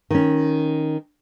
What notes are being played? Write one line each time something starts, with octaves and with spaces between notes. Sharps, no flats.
D#3 C#4